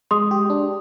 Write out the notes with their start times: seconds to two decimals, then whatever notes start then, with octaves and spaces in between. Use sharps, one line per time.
0.11 G#3 C6 D#6
0.31 G4
0.50 D4